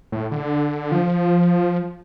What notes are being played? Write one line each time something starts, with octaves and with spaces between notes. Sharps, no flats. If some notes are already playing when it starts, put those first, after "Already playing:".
A2
D3
F3